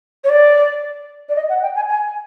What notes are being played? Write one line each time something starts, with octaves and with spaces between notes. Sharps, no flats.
C#5
D5
D5
D#5
F#5
G5
G#5
G#5